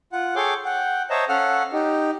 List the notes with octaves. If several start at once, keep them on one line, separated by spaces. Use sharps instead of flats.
F4 F#5
G#4 A4 C#5 G5 C6 D6
F#5 G5
C5 C#5 D#5 E5 A5 A#5
C#4 A4 F5 F#5 F6
D#4 G4